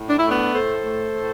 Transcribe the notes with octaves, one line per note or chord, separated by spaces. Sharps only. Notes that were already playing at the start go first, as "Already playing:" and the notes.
Already playing: A2
D4
E4
A3 B3 D4
A2 A4 C5
A3
A2